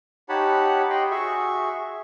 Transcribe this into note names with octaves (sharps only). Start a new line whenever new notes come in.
D#4 G4 C#5 F#5 A5 B5
G4 D#5 G5 B5 C6
F#4 G#4 E5 C#6